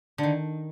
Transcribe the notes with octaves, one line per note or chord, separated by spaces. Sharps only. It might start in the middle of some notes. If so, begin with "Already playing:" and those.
D3
D#3